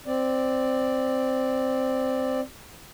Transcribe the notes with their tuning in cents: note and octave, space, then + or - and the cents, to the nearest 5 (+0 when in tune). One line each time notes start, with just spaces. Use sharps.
C4 +0 D5 +5